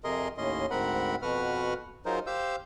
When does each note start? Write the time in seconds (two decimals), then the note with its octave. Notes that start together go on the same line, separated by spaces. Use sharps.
0.04 F2 C3 G#4 A#4 D#5 C6
0.38 D#2 A2 C#4 D#5 C6
0.71 D2 G#2 C4 A#4 F#5 B5
1.22 F2 B2 F#4 B4 F#5 F6
2.06 F#3 D#4 F4 G#4 A#4 C5
2.27 G4 C5 F5 E6 G6